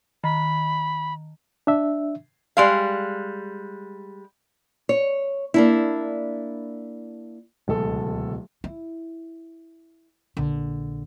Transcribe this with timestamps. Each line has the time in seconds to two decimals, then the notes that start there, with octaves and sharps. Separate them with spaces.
0.24 D#3 B5
1.67 D4 E5
2.57 G3 G#3 F5
4.89 C#5
5.54 A#3 D4 E4
7.68 D1 C#2 B2 G#3 A4
8.64 E4
10.37 A#1 D3